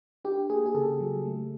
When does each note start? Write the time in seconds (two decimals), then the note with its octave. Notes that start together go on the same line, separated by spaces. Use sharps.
0.25 D4 G4
0.50 A#3 G#4
0.66 G#4
0.75 C#3 A4
1.00 F#3
1.25 A3